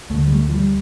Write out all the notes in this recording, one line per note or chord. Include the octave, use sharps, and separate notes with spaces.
D2 D3 A3
G3
A3
F3
G3